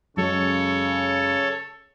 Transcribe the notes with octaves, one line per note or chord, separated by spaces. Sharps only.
F#2 C#3 F#3 G#3 A4 C#5